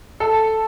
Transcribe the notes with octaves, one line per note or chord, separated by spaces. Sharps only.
A4